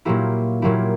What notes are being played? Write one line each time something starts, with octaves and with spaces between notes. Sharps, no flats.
A#2 F#3 A#3 E4 G4
A#2 F#3 A#3 E4 G4